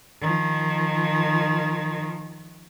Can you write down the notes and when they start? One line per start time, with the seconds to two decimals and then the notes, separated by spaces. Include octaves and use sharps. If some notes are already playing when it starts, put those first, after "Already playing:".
0.21 D#3 F3